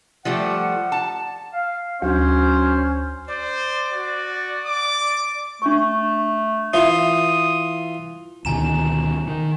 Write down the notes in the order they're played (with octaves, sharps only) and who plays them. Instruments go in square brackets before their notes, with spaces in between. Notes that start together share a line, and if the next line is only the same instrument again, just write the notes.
[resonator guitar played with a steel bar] F3 G3 A3 [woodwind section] F#5
[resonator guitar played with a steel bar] A5
[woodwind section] F5
[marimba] D2 [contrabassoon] F#3 [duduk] C#4 [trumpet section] C5
[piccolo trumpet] C5 [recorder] D5
[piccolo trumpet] F#4
D6
[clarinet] A3 [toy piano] D4 C#6
[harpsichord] E3 F4 [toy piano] E5 [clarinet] D#6
[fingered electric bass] D2 B2 D#3 [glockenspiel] G#5 A#5 E7
[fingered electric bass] D#3